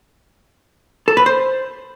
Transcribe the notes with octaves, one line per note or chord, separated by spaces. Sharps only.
A4
B4
C5